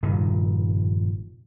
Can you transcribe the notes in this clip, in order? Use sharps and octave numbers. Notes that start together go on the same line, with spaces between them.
F1 G2 A#2 D#3